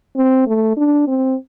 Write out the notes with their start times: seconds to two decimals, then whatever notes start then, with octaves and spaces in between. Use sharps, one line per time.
0.16 C4
0.47 A3
0.77 D4
1.07 C4